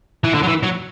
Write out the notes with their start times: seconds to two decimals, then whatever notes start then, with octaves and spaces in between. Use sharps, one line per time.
0.24 E3
0.34 D3
0.43 F#3
0.48 E3
0.63 F#3